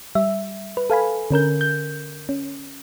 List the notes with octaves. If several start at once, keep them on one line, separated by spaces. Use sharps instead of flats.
G3 E5
B4
A4 F5 G#5 B5
D3 C#4 A#4 G6
G6
C#4